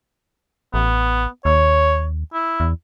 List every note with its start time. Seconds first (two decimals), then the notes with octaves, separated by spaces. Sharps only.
0.74 A1 B3
1.45 D#2 C#5
2.34 E4
2.60 E2